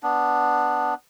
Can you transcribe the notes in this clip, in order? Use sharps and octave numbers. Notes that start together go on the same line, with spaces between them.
B3 D4